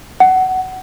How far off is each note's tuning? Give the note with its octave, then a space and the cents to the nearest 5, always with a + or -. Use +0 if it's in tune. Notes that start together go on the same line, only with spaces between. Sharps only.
F#5 +15